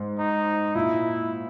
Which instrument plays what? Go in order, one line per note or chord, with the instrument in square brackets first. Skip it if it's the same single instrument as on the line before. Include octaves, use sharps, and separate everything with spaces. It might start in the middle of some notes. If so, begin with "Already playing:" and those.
Already playing: [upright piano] G#2
[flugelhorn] D#4
[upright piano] A#2 [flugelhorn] E4